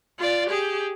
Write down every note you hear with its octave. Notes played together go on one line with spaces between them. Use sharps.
F4 D5
G4 G#4